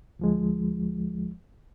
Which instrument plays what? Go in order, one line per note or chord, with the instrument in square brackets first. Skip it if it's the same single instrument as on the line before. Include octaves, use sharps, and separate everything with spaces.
[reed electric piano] D2 F3 G#3